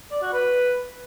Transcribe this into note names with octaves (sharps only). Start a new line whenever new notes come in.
D5
F#4
B4